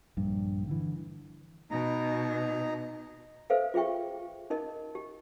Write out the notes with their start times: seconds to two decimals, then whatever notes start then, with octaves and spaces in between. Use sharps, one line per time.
0.17 A#1 G2
0.67 D3 E3
1.71 B2 D#4 A#5
3.50 A4 B4 C5 E5 F5
3.74 F4 G#4 E5 G5 C#6
4.50 D#4 A#4 D#5
4.95 G4